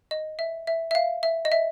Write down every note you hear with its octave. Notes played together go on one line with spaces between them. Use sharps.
D#5
E5
E5
E5
F5
E5
D#5
E5